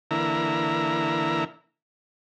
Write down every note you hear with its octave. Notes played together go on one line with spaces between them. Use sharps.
D3 E3 A#3 E4 A#5